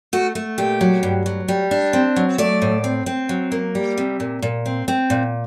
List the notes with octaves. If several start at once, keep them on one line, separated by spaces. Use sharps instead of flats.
A3 F#4
A3
A#2 G4
F#3
G2
F#3
G3
D4
C4
F#3
A3 D5
A2
C4
C4
F#3
A#3
G3
C3
A#2
A#2
C4
C4
A#2